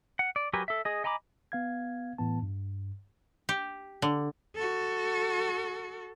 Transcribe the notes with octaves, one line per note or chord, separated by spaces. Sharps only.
F#5
D5
F#3 G4 A#4 B4 G#5
A4 E5
G#4 D#5
D#5 G#5 A#5 B5 D6
B3 F5 G#6
A2 E3 B3 A5
G2
G4
D3
F#4 A4